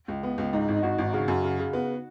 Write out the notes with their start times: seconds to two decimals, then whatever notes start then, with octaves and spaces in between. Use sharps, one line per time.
0.08 C#2
0.23 B3
0.38 C#2
0.53 G#2 D#4
0.68 G#1
0.77 D#4
0.83 G#1 F#4
0.98 G#1
1.13 C#3 F#4
1.28 F#2
1.44 C#3
1.59 C#3
1.73 B3